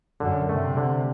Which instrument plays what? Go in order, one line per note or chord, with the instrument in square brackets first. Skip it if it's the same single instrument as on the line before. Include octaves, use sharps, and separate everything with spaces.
[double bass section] F#2 [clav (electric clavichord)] D3
[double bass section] C3 [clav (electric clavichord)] A3
[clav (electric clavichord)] D3